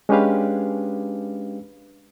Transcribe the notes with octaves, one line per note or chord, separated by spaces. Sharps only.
G#3 C#4 D4 G4 B4 F5